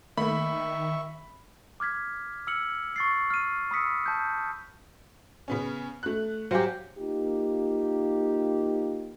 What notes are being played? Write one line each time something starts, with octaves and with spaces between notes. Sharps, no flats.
D#3 A3 A#3 E5 B5 C#6
D6 F6 G#6 B6
E6 F6 C#7 F#7
C#6 A6 C7
F6 D#7
B5 D#6 E6 B6 C#7
A5 G6
C#3 B3 C#4
A3 F#6
F#3 G4 C5 F5 G#5
A#3 D#4 F4 G4